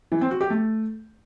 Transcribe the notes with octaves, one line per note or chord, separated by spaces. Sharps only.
E3
C4
F#4
G4
A3